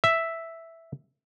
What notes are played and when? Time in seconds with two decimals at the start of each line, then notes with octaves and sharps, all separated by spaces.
0.04 E5